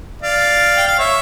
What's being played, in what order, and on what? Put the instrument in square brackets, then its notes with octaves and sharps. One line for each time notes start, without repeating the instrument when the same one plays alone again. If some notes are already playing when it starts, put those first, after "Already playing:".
[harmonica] D5 F5
G5
F5
C#5 E5